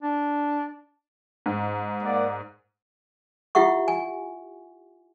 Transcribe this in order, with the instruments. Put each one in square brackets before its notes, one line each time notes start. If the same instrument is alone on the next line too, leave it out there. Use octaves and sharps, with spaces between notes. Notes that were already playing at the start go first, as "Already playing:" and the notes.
[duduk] D4
[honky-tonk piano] G#2
[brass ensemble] A#3 D5 F#5
[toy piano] E4 F4 G4 E5 F#5 C#6
G#5